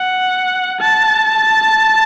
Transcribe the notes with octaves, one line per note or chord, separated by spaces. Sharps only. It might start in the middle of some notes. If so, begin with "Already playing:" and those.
Already playing: F#5
A5